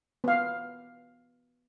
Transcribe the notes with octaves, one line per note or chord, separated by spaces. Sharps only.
B3 F5